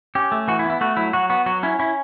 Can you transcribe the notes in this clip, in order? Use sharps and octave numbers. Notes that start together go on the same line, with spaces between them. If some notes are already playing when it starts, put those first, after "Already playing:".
C#4 G4
A3
E3 F#4
E4
B3
E4
A3 F#4
F#3 E4
F#3 F#4
B3 F#4
F#3 F#4
C#4 E4
C#4 E4